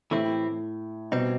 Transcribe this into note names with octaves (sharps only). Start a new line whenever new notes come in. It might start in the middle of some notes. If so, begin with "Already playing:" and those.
A2 E3 A3 C4 E4 G4
B2 G3 C4 D#4